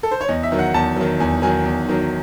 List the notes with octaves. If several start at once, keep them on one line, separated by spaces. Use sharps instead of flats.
A4
C5
C#5
E2 D#5
E5
D#3 F#3
F#5
E2 A5
D#3 F#3
E2 G#5
D#3 F#3 G#5
E2
D#3 F#3